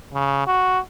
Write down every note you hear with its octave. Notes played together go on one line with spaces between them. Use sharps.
C#3
F#4